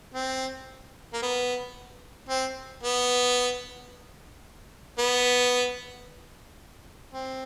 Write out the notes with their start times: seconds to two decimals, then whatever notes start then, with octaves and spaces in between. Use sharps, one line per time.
0.14 C4
1.13 A#3
1.22 B3
2.29 C4
2.83 B3
4.98 B3
7.13 C4